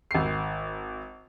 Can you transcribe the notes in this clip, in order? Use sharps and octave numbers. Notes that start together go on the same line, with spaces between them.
G#1 C7